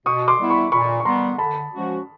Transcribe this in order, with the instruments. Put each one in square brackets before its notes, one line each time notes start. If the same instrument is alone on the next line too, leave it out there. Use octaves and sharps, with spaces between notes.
[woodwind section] B2 [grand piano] C#6 D#6
[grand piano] C6 D6
[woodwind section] G3 B3 E4
[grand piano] B5 C#6
[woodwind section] A#2 [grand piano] B5 C#6
[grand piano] C#6
[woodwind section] G3 B3 [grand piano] A#5 C6
[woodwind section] D3 [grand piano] A5 B5
[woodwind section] F3 G#3 C#4 F#4